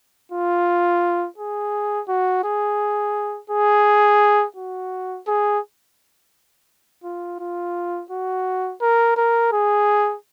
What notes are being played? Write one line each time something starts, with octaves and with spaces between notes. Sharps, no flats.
F4
G#4
F#4
G#4
G#4
F#4
G#4
F4
F4
F#4
A#4
A#4
G#4